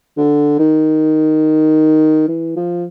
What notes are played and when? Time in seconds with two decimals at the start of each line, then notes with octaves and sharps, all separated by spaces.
0.17 D3
0.59 D#3
2.28 E3
2.56 F3